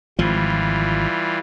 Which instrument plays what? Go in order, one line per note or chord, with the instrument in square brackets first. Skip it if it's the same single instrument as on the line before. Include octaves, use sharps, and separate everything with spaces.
[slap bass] G#1 F3 [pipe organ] E3 G3 F4